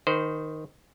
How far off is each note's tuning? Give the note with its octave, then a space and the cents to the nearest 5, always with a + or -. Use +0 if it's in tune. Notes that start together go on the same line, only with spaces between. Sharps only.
D#3 +0 C5 -20